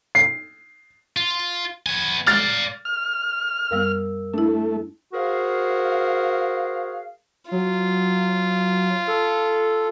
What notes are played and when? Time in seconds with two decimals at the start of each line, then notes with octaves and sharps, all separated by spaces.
0.15 C7
1.17 F4
1.86 B3 G#5
2.27 D5 F5 F6 A6
2.85 F6
3.71 F#2 G3 B3 A#4 F5 E6
4.34 A3 D4 E4
5.13 F#4 G#4 A#4 C5 F5
7.51 F#3 F4
9.07 A4